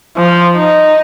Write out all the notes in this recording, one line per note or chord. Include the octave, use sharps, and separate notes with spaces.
F3
D#4